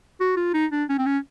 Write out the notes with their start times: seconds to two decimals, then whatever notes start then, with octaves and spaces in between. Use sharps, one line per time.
0.20 F#4
0.37 F4
0.54 D#4
0.72 D4
0.89 C#4
0.98 C4
1.06 C#4